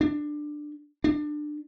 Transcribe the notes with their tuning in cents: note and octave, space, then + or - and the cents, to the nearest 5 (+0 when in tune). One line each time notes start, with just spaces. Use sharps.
D4 +15
D4 +25